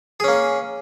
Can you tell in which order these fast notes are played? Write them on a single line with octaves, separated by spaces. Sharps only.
G#4 C#4 A#3